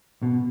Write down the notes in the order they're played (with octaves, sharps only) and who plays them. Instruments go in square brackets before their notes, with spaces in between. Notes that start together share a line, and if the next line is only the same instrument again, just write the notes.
[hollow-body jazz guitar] B2